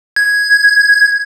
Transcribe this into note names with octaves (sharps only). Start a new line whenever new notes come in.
G#6